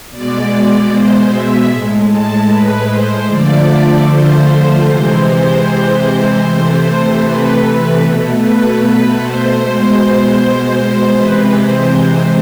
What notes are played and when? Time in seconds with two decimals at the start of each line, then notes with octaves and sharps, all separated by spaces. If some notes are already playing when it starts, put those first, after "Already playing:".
0.11 B2 G#3 D5
0.50 D5
0.90 C5
1.29 E5
1.69 A2 G#3
2.08 A5
2.48 B4
2.87 C5
3.26 D3 F3 A3 D5
4.05 C5
4.84 C3 E3 G#3 C5
5.24 C5
6.42 C3 E3 A3
7.20 B4
8.00 B2 A3
8.39 B4
8.78 B4
9.18 C5
9.57 B2 G#3
11.14 C3 E3 G#3 B4
11.54 C5
11.94 C5